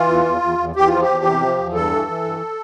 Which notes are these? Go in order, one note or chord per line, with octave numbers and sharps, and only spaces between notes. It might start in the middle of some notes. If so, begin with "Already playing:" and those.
Already playing: E3 F4
E2
E2
E2
E2
E2 G4
F3 F4
G4
E2
C3
F3
E2
G2 A4
E3
E3
G2